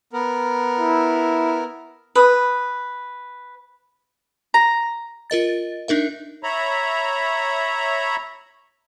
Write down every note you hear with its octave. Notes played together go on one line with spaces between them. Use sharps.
B3 A#4
E4
B4 D#6
A#5
F4 A#4 D#5 A6
D4 D#4 A#4 E5
C#5 E5 A#5 B5